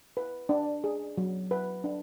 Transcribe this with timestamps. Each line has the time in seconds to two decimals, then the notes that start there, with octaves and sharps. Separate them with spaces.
0.17 B4
0.49 D4
0.84 G#4
1.18 F#3
1.51 B4
1.84 D4